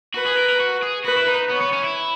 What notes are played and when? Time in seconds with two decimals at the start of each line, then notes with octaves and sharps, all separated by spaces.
0.14 F#4 B4
0.26 G#4
0.37 A#4
0.49 A#4
0.60 F#4
0.83 G#4
1.05 F#4 B4
1.17 E4
1.28 D#4
1.50 B3 C#5
1.61 B3
1.73 C#4
1.84 E4